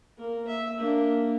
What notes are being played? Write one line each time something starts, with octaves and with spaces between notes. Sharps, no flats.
A#3 A#4
E5
A#3 D4